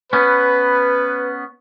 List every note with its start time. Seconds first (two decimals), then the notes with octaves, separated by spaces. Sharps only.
0.13 B3 C#4 B4